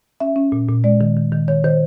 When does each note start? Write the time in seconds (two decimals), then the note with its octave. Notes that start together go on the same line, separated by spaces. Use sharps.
0.20 C#4 E5
0.36 C#4
0.52 A#2
0.69 A#2
0.84 G#3 D5
1.01 D#3
1.16 D#3
1.32 D#3
1.48 D#3 C#5
1.64 D#3 C5